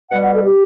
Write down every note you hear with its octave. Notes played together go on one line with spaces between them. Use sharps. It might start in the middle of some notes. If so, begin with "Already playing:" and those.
B2 G3 F#5
F#5
A4
G4